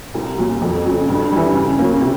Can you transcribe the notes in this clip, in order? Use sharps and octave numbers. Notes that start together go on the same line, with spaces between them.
C2
A#2 F#3
F2
C#3 F#3
G2
E3 G3
C#3
F#3 A#3 C#4
C3